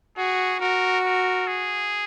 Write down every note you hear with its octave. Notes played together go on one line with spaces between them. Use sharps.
F#4 G#4
F#4 A#4
A#4
G#4